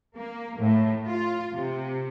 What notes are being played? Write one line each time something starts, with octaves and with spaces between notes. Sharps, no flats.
A#3
A2
F4
C3